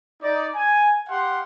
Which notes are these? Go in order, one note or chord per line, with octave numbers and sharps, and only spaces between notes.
D#4 D5
G#5
G4 F5 F#5 C6